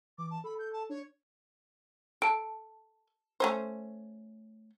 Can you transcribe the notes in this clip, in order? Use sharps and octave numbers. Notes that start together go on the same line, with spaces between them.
E3 D6
A5
A4 B5
G6
A5
D4 C#5
A4 A5 D7
A3 C#4 C5